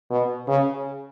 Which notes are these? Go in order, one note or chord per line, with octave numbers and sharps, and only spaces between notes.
B2
C#3